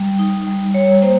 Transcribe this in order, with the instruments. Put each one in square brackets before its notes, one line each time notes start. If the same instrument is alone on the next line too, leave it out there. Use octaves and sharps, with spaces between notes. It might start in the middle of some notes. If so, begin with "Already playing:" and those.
Already playing: [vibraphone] G3
D#4
G3
G3 C#5
A#3 C5